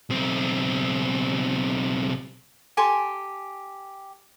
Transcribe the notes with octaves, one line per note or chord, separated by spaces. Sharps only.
B1 C4
G4 A4 G#5 C6